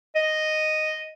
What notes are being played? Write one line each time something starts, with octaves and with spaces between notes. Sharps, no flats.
D#5